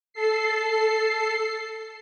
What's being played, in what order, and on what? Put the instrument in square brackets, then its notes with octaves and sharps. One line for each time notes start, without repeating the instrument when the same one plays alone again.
[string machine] A4 C7